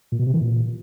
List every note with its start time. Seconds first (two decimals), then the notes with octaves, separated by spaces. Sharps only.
0.12 A#2
0.19 B2
0.27 C3
0.34 E3
0.41 A#2